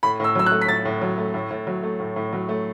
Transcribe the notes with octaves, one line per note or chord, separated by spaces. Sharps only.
A2 B5
A2 E6
F#3 E6
F#6
A3
B6
A2 A6
A2
F#3
A3
A2
A2
F#3
A3
A2
A2
F#3
A3